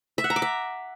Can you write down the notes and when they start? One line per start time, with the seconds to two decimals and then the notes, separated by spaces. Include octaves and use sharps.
0.18 E5
0.24 F#5
0.30 A#5
0.36 D6
0.42 E5